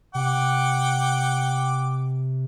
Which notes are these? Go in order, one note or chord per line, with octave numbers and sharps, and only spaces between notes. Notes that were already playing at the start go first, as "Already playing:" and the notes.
C3 F#5 G5 D6